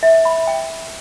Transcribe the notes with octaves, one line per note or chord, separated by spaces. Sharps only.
E5
B5
G5